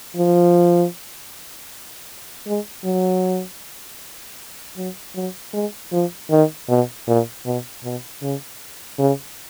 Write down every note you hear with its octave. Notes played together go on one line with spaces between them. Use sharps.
F3
G#3
F#3
F#3
F#3
G#3
F3
D#3
B2
A#2
B2
B2
C#3
C#3